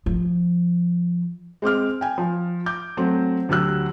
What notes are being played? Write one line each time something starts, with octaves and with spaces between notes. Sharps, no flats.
F3
G#3 C4 D6 F6
G5 G#5
F3
D6 G6
F#3 A3 C4
D2 F#3 G4 E6 F#6